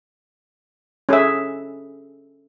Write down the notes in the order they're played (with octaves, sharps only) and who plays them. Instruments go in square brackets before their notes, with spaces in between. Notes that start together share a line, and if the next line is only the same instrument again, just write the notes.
[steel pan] C#4 G#4 A4 E5